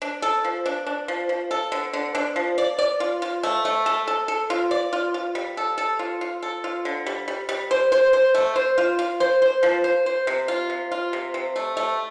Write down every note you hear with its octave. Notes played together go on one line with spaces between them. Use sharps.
D4
A4
F3
D4
D4
F3
F3
A4
D3
D3
D4
F3
D5
D5
F4
F4
A3
A3
A4
A4
A4
F4
D5
F4
F4
G3
A4
A4
F4
F4
A4
F4
D3
G3
G3
G3
C5
C5
C5
A3
C5
F4
F4
C5
C5
F3
C5
C5
C3
F4
C3
F4
C3
C3
A3
A3